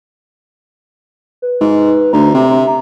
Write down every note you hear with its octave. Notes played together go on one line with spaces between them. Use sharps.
B4
G#2
D2 A#5
C3
A#5